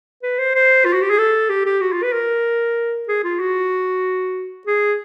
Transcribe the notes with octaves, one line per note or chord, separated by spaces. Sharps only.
B4
C5
C5
F4
F#4
G4
G#4
A4
G4
G4
F#4
F4
B4
A#4
G#4
F4
F#4
G#4